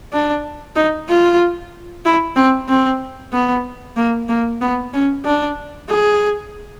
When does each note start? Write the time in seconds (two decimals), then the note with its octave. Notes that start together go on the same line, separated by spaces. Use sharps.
0.13 D4
0.76 D#4
1.09 F4
2.05 E4
2.36 C4
2.69 C4
3.32 B3
3.97 A#3
4.29 A#3
4.61 B3
4.93 C#4
5.25 D4
5.89 G#4